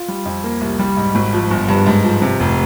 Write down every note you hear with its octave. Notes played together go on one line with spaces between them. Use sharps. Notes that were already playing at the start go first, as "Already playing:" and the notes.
Already playing: F4
G3
F2
A#3
C2
G3
G#2
G#1
F3
G1
G2
G#2
F3
C3
F1